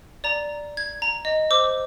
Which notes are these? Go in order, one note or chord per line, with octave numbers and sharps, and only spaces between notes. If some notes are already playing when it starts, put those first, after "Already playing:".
D5 A#5
G#6
A#5
D#5
C5 D6 E6